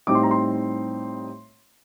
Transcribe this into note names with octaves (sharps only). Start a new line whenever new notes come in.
A2 G3 C4 D#4 D6
C6
A#5
C6